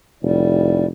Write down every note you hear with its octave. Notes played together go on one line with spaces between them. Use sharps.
F1 A2 G3